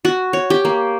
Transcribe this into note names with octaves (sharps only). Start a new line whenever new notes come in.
F#4
C#5
G4
A#3